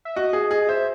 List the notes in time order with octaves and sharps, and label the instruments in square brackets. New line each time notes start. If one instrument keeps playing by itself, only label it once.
[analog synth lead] E5
[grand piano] F#4 [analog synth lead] D#5
[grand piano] G#4
G#4
[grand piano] C5 [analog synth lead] E5